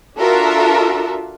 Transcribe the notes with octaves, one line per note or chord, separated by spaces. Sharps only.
D4 F4 F#4 A4 A#4 E5